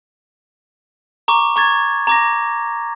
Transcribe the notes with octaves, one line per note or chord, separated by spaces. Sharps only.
A#5 C#6 D6
A#5 C#6 G#6 A6
A#5 D6 A#6